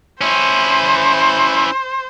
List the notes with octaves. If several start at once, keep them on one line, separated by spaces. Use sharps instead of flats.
C#4 E4 C5